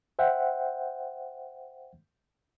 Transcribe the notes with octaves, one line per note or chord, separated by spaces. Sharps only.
C5 E5 F#5 G5